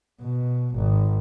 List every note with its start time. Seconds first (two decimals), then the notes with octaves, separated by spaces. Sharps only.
0.21 B2
0.76 G#1